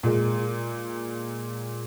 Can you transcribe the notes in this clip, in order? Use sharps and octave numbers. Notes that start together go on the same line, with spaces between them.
A#2 G#3